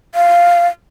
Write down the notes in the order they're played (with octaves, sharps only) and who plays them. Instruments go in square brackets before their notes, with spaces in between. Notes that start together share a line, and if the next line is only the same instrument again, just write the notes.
[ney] F5